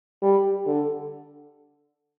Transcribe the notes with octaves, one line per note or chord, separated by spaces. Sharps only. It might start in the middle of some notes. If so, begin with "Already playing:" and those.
G3
D3